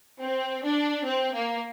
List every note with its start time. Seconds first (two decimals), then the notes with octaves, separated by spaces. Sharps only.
0.22 C4
0.64 D4
1.06 C4
1.34 A#3